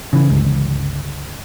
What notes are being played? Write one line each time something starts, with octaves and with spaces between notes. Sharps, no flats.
C#3 E3
G1 C#2